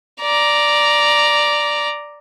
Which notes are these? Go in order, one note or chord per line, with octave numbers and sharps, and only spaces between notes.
D5 A#5